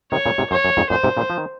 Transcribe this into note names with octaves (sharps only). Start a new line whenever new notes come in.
C3 D#3 C#5
A#2 C#3
G#2 C3
F#2 C#5
F#2
F2 G#2
F#2 A#2 C5
G#2 C3
A#2 C#3
F3
D#3